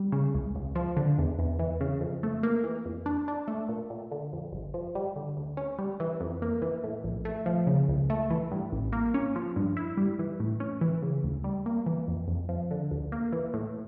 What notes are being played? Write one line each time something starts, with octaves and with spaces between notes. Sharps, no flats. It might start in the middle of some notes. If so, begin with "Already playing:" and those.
Already playing: G3
C#3
C#2
C#2
F3
D3
E2
E2
E3
C#3
F2
A3
A#3
E3
F2
D4
D4
A3
A#2
A#2
D3
F2
G1
F3
G3
D3
D2
C#4
G3
E3
F2
A#3
E3
A2
A#1
A3
F3
C#3
C#2
A3
E3
G2
A1
A#3
C#4
F3
G2
E4
G3
E3
A2
C#4
E3
C#3
D2
G3
A#3
E3
F2
F2
F3
D3
D2
A#3
E3
A2